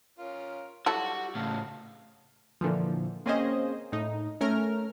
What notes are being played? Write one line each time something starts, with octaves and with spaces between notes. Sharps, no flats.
C#4 F4 A#4
F#3 G3 E4 F#4 A4 C#6
A2 C#3 F5 A5
A#2 D3 E3 F3
A#3 C4 C#4 G#4 C5 D#5
A2 D#4
A3 C#4 A#4 F6